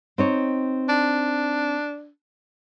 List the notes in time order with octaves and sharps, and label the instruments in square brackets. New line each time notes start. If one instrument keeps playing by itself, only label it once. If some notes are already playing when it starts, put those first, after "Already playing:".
[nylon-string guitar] C4 D#4 C#5
[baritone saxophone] D4